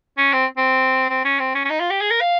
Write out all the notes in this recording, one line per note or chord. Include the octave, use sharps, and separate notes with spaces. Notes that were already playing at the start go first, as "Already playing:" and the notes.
C#4
C4
C4
C4
C#4
C4
C#4
C#4
D#4
F4
G4
G#4
A#4
F5